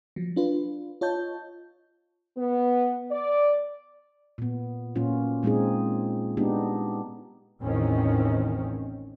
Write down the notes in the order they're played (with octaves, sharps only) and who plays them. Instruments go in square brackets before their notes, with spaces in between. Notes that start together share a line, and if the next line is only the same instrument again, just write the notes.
[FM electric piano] F3 F#3
D4 F4 B4
F4 C#5 D#5 A5 G6
[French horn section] B3
D5
[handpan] A#2 B3
A#2 F#3 A#3 C#4 F4
A#2 G#3 C4 D#4 G#4
G#3 B3 D4 D#4 G4
[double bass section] A1 E2 D#3 C4 C#4